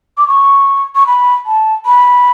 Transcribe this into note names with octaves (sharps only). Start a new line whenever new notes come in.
D6
C#6
C#6
B5
A5
B5